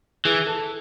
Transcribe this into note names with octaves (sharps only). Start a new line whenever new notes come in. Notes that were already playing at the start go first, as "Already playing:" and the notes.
E3 G#4
A4